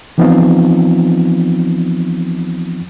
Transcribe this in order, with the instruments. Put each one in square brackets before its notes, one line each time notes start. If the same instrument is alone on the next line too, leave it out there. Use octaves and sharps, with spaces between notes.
[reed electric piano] E3 F3 B3 C4 D#4 F4